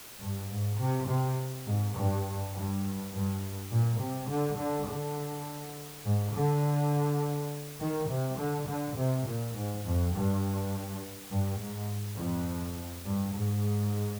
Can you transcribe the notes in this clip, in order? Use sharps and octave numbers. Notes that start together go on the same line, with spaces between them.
G2
G#2
C3
C3
G#2
G2
G2
G2
A#2
C3
D3
D3
D3
G#2
D3
D#3
C3
D3
D3
C3
A#2
G#2
F2
G2
G2
G#2
F2
G2
G#2